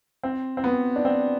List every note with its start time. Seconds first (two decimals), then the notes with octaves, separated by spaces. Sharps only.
0.23 C4
0.57 C4
0.64 B3
0.96 D4
1.05 C4